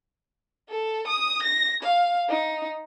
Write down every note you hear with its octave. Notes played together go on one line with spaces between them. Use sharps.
A4
D#6
A#6
F5
D#4